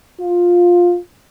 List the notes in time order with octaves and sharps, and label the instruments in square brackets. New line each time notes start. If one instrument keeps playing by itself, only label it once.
[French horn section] F4